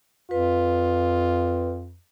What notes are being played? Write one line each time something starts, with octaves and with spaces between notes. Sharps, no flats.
F2 F4 B4